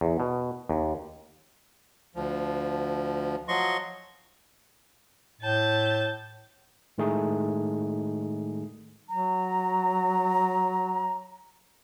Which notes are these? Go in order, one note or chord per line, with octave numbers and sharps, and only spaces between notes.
E2
B2
D#2
D2 F3
F3 F#3 D#5 C6 C#6
A2 A5 G6
A2 D#3 G#3 A3 D#4 G#4
F#3 A#5